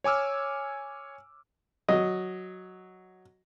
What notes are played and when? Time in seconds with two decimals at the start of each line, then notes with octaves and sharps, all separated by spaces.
0.04 C#5 G#5 D6 E6 F6
1.88 F#3 D#5